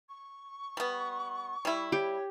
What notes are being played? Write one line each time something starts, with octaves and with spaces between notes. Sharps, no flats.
C#6
G3 B3
G3 E4
G4 C#5